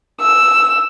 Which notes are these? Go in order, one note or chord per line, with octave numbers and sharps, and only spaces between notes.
E6